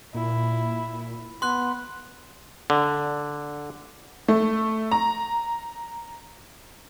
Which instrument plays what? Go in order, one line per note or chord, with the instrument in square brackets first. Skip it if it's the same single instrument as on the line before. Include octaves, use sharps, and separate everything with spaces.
[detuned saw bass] A#2 [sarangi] E4
[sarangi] B3 [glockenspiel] C6 F#6
[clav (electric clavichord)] D3
[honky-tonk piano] A3
A#5